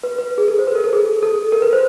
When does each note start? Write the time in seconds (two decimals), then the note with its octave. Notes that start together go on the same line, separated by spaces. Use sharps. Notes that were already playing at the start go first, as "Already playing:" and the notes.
0.03 B4
0.19 B4
0.38 G#4
0.48 A4
0.59 C5
0.67 B4
0.75 A#4
0.84 A4
0.93 G#4
1.23 A4
1.52 A#4
1.62 B4
1.73 C5